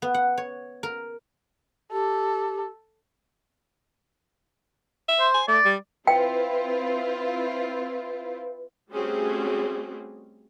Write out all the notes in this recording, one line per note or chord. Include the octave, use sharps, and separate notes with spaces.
B3
F#5
C#5
A#4
G4 A4
E5
C5
G#5
A3 D5
G3
C4 E4 F4 B4 G5
G3 A3 C4 C#4 F#4 G#4